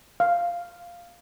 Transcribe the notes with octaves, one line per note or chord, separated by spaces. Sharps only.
F5